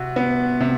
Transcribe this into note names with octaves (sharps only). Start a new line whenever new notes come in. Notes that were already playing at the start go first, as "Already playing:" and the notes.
Already playing: C3 F#4
B3
C3